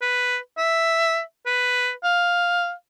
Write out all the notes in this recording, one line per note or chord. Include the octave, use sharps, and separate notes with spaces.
B4
E5
B4
F5